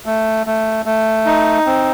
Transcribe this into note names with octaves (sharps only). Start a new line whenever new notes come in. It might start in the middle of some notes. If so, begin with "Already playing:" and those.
A3
A3
A3
D#4
C4